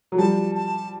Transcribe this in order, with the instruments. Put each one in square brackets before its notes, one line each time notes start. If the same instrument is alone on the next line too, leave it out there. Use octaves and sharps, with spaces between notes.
[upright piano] F#3
[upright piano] F3 G3 [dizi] A5
[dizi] A5